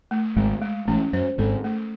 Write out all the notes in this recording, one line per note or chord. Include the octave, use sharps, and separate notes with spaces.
A3
G#1 G#2 G#3
G#3
A1 A2 C#4
F#2 C5
G#1 G#2 A4
A3